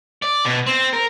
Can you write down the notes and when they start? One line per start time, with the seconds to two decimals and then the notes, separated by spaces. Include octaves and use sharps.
0.22 D5
0.45 B2
0.67 C4
0.93 A#4